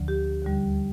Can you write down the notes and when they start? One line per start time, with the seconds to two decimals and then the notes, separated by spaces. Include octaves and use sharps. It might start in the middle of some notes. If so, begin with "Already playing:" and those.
Already playing: D2 D3 F3
0.08 G4
0.42 D#2 D3 G3